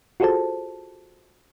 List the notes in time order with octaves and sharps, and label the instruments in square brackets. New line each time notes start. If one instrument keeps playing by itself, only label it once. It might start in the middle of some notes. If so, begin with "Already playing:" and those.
[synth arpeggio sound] F4 F#4 G#4 A4 C5 A5